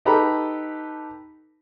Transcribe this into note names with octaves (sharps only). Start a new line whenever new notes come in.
D#4 G4 A4 B4 A#5 B5